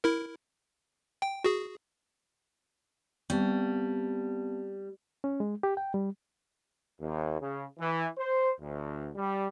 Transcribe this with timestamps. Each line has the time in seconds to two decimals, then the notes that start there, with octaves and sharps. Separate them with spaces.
0.04 E4 A#4
1.22 G5
1.44 F#4 G#4
3.30 G3 B3 C4 A5
5.24 C#4
5.40 G#3
5.63 G4
5.77 G5
5.94 G3
7.01 D#2
7.41 C#3
7.79 E3
8.18 C5
8.61 D2
9.16 G3